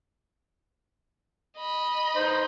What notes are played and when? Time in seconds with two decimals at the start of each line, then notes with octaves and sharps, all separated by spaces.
1.58 D#5 B5
2.16 D#4 B4 C5